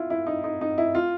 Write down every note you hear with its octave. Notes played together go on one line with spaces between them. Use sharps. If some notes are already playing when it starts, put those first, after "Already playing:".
Already playing: E4 F4
E4
D#4
D#4
D#4
E4
F4